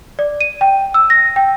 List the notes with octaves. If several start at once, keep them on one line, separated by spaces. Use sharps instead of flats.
D5
D#7
G5
E6
A#6
G5